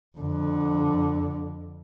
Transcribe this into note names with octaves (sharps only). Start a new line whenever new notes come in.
F2 D3